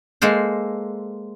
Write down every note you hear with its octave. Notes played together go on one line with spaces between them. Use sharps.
G#3 A#3 A4 C5